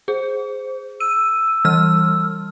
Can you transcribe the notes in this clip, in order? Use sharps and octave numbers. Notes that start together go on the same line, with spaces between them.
G#4 C5
E6 D#7
E3 G3 F6